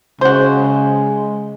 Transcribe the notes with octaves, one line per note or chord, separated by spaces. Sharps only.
C#3 G#3 F#4 C5